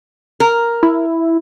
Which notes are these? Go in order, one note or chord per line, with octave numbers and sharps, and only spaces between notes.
A#4
E4